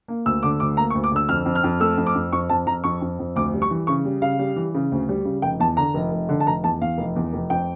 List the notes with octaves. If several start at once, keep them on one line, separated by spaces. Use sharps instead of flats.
A#3
D2 E6
D3 D6
D2 D6
A#3 A#5
C#6
D2
D6
D3 E6
F2 F6
F2
F6
F2
A3 E6
F2
D6
F2
F2 C#6
F2 A5
F2 A#5
F2 C#6
F2
F2
D2 D6
G3
C#6
E3
C#3 C#6
G3
C#3 F5
G3
E3
C#3
D2
G3
C#3
F1 G5
E2 A5
D3 A#5
F1
F1
D3
A5
F1 A#5
E2 A5
E2 F5
F1
E2
F1
F2 G5